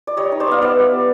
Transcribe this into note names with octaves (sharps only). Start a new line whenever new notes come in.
D5
G3 C#5 D#5
D#4
C5 D5
B3 D#5 F5
B3 D5 E5
B3
G3